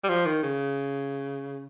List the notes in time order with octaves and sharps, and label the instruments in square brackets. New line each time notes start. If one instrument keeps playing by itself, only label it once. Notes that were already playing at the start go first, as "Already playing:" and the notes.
[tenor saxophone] G3
F3
D#3
C#3